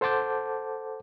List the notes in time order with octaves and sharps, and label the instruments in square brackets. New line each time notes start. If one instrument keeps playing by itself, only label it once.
[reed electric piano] A4 C5 F#5 A5 D6 G6